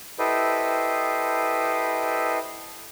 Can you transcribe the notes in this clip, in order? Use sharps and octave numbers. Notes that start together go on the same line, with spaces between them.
E4 G4 A4 B4 C5 D#5